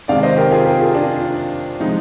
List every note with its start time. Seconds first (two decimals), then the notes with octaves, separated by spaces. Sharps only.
0.08 C3 D#3 G#3 D5 F5
0.23 C5 D#5
0.37 G4 A#4
0.51 F4 G#4
0.65 G4 A#4
0.80 F4 G#4
0.94 D4 F4
1.80 C3 F3 G#3 D#4